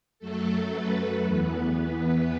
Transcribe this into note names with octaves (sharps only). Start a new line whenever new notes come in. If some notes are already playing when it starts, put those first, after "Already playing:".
F#2 F#3 A3 A4
B4
E2 E3 B3